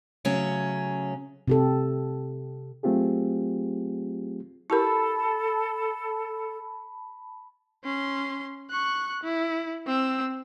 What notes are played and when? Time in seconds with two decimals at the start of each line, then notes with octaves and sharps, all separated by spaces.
0.25 C#3 F#3 A3 C#4
1.48 C3 G4 A4
2.83 F#3 A3 C4 F4 G4 G#4
4.70 E4 G4 A4 A#4 A5 B5
7.84 C#4 C6
8.70 C#6 F#6
9.23 E4
9.86 C4 E6